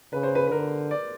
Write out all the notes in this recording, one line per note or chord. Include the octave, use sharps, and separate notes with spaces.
C#3 B4
C5
B4
B4
D3 A#4
D5